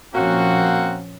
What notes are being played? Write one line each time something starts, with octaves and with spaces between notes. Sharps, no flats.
A#2 F3 A#3 C4 C#4 F#4